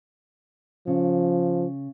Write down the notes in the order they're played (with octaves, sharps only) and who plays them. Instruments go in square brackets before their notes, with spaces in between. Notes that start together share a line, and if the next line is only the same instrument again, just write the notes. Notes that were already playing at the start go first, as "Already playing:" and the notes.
[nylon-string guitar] C#3 [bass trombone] F3